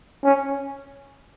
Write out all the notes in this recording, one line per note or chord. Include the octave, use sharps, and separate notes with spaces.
C#4